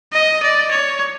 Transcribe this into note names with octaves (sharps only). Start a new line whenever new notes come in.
D#5
D5
C#5